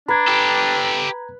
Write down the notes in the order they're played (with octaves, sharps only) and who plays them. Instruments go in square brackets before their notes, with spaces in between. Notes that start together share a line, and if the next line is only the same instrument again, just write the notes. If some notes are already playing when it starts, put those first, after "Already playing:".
[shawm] D4 [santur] B4 [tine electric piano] A#5 G#6
[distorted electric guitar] G4 A4